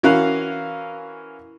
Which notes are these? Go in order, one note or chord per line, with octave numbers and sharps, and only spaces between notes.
E3 C#4 F#4 A#4 F5 F#6